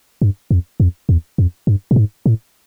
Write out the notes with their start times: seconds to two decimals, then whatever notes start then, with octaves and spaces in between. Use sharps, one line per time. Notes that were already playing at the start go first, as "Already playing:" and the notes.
0.22 G2
0.51 F2
0.80 F2
1.09 E2
1.38 F2
1.67 G2
1.91 A2
1.96 G#2
2.26 A2